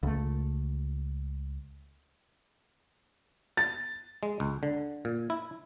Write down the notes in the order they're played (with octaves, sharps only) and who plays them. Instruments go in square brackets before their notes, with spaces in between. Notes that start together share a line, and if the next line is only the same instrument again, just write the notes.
[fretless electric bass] C#2 A3
[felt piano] A6
[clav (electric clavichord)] G#3
C#2
D3
A#2
E4